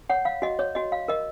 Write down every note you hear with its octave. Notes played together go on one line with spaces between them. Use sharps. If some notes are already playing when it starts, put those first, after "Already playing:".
C#5 F#5
F5
F#4 D#5
C#5
F#4 D#5
F5
A#4 D#5